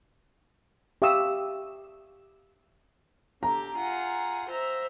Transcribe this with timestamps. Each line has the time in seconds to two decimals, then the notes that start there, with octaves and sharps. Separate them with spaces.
1.02 G4 E5 F5 C#6 D#6 E6
3.43 D3 G4 A#5
3.76 F4 G#4 F#5
4.50 C5 E5 A#5